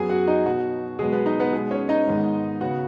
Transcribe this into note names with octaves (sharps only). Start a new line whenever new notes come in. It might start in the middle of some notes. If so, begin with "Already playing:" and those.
Already playing: F#2 F#3 B3 G#4 G#5
F#4 F#5
D#4 D#5
B2 F#3 B3 F#4
B2 F#3 G#3 B3 G#4
B3 B4
D#4 D#5
B3 B4
B2 G#3 B3 G#4
C#4 C#5
D#4 D#5
G#2 D#3 G#3 B3
C#3 B3 F#4 F#5